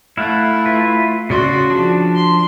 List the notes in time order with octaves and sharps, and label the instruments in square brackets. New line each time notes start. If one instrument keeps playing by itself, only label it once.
[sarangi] A3 [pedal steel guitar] E4 F5 F#5
[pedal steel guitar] E4 F4 B4
[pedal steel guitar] C#3 D5 C6 [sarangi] F#4
[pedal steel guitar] F3 D4
[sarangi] C6